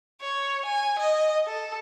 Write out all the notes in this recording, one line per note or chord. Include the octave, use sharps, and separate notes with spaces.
C#5
G#5
D#5
A4